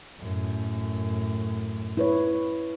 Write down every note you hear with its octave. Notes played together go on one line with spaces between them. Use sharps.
F#2 A2
E4 B4 C#5